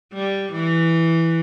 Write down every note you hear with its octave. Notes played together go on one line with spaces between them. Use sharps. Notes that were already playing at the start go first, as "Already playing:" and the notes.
G3
E3